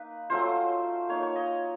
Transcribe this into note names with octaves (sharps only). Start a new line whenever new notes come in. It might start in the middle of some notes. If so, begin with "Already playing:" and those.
Already playing: A#3 D#4 B4
F#3 A3 C#4 F4 C5
A#3 D#4 C#5
C#5
D#5